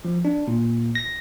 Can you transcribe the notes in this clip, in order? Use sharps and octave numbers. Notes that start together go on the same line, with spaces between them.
F3
D4
A#2
A#6